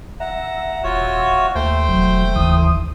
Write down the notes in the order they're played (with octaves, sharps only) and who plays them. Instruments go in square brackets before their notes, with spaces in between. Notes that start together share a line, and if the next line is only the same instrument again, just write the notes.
[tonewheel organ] E5 [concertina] F#5 A#5
[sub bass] D#1 [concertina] F4 F#4 C#5
[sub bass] D#2 [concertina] A3 C5 G5
[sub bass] E1 [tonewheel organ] F#3
[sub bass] F#1 [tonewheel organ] D#2 E3 D#6